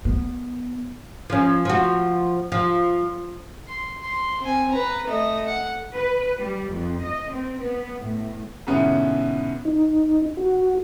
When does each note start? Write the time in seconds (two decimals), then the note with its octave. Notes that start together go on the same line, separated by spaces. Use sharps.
0.05 B3
1.30 F3 C#4
1.65 F3 F#4
2.52 F3
3.67 C6
4.04 C6
4.41 C4 G#5
4.72 B4 A#5
5.07 A3 D#5
5.48 F#5
5.93 B4
6.38 G3
6.71 F2
7.03 D#5
7.32 C4
7.61 B3
7.97 A2
8.67 G#2 B2 D3 B3 C#4 E4
9.65 D#4
10.37 F#4